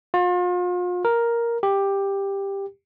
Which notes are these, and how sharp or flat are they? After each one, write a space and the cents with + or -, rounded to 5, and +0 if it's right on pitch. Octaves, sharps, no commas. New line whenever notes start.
F4 +40
A#4 +5
G4 +10